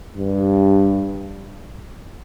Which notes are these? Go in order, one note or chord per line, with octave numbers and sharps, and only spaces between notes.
G2